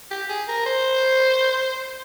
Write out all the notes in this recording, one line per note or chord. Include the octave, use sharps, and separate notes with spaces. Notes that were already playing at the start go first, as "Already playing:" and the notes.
G4
G#4
A#4
C5